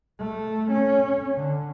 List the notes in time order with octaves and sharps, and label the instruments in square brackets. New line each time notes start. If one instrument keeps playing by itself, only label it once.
[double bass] A3
C#4
D3